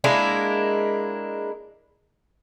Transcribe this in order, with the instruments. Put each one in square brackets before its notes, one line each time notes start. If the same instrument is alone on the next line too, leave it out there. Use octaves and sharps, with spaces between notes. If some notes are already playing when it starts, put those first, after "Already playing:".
[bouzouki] G#3 A#3 D4 E4